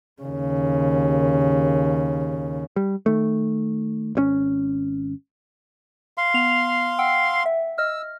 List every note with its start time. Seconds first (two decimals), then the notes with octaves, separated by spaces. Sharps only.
0.22 D#2 C#3
2.76 G3
3.06 D#3 A3
4.15 G#1 B2 C#4
6.18 F5 C6
6.34 B3 F7
6.99 F#5 G5 E6
7.46 E5
7.78 D#5 E6 F6